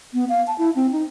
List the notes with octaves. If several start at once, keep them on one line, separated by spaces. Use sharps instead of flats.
B3
F5
A5
E4
C4
D#4